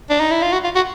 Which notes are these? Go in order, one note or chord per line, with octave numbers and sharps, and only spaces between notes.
D4
D#4
E4
F4
F#4
F4
F#4